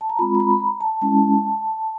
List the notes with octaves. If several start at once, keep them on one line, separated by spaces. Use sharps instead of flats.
A5
A#5
G#3 C4 F4 B5
A#5
B5
B5
A#5
A5
G#3 C#4 E4 A5